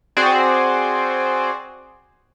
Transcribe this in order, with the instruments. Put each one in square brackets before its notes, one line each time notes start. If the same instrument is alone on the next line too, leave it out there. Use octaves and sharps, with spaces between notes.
[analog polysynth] C4 F#4 G#4 C5 D5